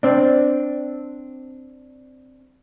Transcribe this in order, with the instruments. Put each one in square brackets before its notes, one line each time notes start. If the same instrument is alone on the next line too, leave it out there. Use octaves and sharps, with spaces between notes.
[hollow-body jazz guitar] C4 D4